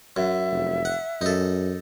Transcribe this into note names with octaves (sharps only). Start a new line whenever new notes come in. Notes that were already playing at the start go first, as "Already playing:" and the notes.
F#2 E5
F1
F#5
F#2 D#4 A4